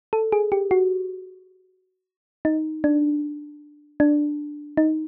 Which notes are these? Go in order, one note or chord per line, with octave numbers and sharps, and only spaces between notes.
A4
G#4
G4
F#4
D#4
D4
D4
D#4